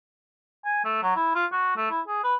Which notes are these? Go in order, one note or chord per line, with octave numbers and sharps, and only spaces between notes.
G#5
A3
F#3
E4
F4
F#4
A3
E4
G#4
B4